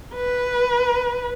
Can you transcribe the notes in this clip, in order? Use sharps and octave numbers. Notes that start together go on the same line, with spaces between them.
B4